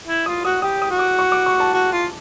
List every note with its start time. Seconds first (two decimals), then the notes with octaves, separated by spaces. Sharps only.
0.07 E4
0.26 F4 D#6
0.45 F#4 D#6
0.62 G4 D#6
0.82 D#6
0.90 F#4
0.99 D6
1.19 C#6
1.32 D6
1.46 C#6
1.60 A5
1.73 F#4
1.92 F4